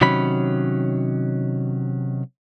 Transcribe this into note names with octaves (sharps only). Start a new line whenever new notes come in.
C3 D#3 F#3 C#4 B5